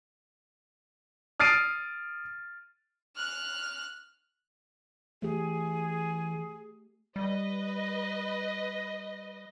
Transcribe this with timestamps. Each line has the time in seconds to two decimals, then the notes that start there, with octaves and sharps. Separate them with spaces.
1.40 D#6 F6 A6 C7 D7 D#7
3.16 F6 F#6
5.22 E3 A3 G4 G#4
7.16 G3 B4 D#5